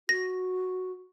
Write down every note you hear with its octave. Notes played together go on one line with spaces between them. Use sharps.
F#4 A#6